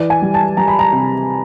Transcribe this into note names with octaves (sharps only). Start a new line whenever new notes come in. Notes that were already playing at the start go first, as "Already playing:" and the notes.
Already playing: E3 D5
G#5
G3
A5
G3 A#5
B5
A#5
C3